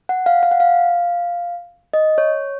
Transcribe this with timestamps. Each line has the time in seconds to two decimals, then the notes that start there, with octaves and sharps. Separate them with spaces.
0.09 F#5
0.26 F5
0.43 F5
0.51 F#5
0.60 F5
1.93 D#5
2.18 C#5